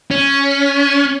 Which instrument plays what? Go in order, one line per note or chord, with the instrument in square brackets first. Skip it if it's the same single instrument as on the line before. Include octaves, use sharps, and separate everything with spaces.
[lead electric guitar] C#4